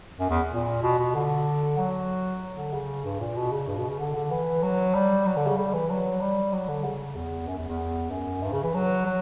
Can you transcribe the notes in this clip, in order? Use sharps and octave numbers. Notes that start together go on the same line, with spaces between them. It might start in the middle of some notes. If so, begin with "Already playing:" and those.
F#2
E2
A#2
B2
B2
D3
F#3
D3
C#3
G2
A#2
B2
C#3
G2
B2
C#3
D3
D3
E3
F#3
G3
F#3
D3
C#3
G3
E3
F#3
G3
F#3
D3
C#3
E2
F#2
E2
E2
F#2
G2
C#3
E3
F#3
F#3